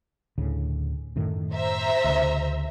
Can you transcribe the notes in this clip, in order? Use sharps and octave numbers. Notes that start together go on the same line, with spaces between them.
D2 A2 C#3
F#2 A2 D#3
C5 E5 A#5
D2 C#3